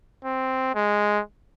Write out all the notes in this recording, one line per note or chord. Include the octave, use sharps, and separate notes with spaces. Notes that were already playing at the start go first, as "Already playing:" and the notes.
C4
G#3